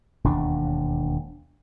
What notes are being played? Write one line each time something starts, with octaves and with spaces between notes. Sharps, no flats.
E1 D#2 D4